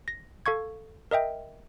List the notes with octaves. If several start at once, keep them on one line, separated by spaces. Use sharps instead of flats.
A#6
A4 F5 C#6 G#6
A#4 D#5 E5 G5